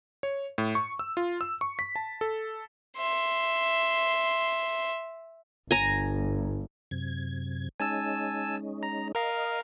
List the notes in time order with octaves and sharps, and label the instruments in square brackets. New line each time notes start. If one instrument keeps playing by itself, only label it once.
[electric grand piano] C#5
A2
C#6
E6
F4
E6
C#6
B6
A5
A4
[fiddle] E5 C6
[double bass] G1 [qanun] G#5 A#5
[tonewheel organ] F#2 C3 G#6
[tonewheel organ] G#3 C#4 D#4 [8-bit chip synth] G#5 A5 E6
[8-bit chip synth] A#5
[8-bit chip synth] A#4 F5 A#5 [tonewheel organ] D#5